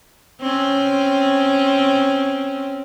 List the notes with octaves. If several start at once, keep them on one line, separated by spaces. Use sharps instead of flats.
C4 C#4